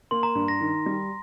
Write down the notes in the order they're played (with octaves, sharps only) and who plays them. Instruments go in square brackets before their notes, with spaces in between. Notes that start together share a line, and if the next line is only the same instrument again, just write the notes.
[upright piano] A#3 [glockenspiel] C6
[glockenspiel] A#5
[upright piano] G2
[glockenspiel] A#6
[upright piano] D#3
G3